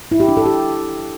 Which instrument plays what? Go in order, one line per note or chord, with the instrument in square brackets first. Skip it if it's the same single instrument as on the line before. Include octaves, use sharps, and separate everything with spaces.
[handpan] E4
G4
D4
A4
G4